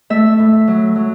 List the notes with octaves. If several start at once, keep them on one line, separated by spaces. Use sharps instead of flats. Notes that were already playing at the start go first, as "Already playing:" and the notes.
A3 E5
A2
F#3
F#3